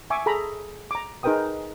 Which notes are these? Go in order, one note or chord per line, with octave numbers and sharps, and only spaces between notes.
E5 G#5 C#6 D6
G#4 A4 A#5 B5
A#5 D6
D#4 G#4 A#4 B4 G5 D#6